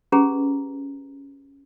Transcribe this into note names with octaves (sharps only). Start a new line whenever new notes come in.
C#4 G4 G#4 B4 A#5